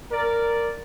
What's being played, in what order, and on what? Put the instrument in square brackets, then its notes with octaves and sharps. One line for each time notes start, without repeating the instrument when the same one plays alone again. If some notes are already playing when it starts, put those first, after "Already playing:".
[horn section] A#4 D5